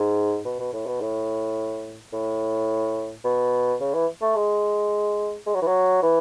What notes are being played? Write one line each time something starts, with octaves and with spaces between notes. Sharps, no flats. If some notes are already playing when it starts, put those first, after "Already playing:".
Already playing: G#2
B2
B2
A2
B2
A2
A2
B2
C#3
E3
A3
G#3
G#3
F#3
E3
F#3
E3